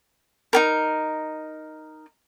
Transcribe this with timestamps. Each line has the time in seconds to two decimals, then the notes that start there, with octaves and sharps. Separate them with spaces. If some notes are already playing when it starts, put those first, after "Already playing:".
0.53 D#4 G4 A#4